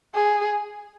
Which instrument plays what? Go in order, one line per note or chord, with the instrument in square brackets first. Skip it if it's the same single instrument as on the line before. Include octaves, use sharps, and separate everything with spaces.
[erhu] G#4